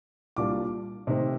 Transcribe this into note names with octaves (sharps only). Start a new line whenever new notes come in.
C2 A#2 G3 D4 F4 D6
C3 D#3 A3 C4 D#4